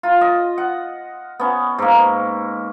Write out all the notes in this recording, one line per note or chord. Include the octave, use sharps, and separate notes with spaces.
F4
D#5
F#5
B3 C#4
G#2 A#3